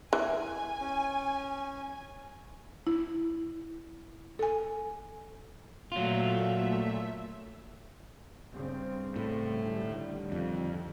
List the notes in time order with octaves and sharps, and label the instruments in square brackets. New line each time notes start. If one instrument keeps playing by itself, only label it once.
[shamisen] E3 [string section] G#5
[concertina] C#4
[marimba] E4
A4 G#5
[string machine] A#2 A3 E5 [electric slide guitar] F#3 F4
[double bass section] G2 C#3 C4
[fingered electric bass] A2
[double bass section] D3 D#3 G3
[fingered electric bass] F2